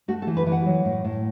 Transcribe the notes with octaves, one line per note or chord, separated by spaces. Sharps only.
A3 F#4
A4
E3
B4
E3
F#5
F#3
A2
A2